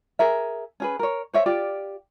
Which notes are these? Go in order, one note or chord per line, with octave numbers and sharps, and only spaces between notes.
G#4 A#4 E5
C#4 G#4 B4
A#4 C#5
C5 C#5 E5
F4 G4 D5